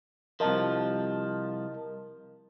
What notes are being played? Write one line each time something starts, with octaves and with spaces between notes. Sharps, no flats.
C2 F3 A#4 D#5 A5